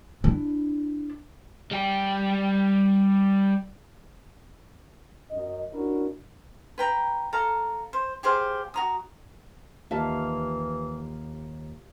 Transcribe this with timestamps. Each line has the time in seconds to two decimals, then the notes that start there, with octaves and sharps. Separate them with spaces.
0.24 D4 E4
1.71 G3 G5
5.30 F#2 D#5
5.73 C#4 D4 E4 F#4 A#4
6.78 B4 G5 A#5
7.33 A4 F5 A#5
7.93 C5
8.23 G4 G#4 C5 F5
8.74 F#4 A#5 D#6
9.91 D#2 E3 F4 G4 E5 F5 A5